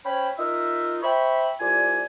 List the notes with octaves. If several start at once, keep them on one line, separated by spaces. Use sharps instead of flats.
C#4 C5 C#5 G5 B5
D#4 F4 A#4 E5
C5 E5 G5 B5 C#6
C2 F4 D5 G#5